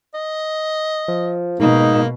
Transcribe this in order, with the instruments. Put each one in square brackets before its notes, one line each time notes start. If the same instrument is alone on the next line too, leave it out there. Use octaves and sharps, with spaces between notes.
[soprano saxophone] D#5
[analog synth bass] F3
[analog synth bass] G#2 [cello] B2 [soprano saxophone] A#3 [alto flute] D#4